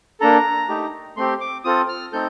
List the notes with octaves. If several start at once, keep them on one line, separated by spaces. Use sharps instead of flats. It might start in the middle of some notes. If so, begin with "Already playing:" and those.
A#3 D4 A4 A#5
A3 D#4 G4
A3 C4 G4 C6
D6
C4 F4 A4 D#6
F6
A3 C4 D#4 A4 G6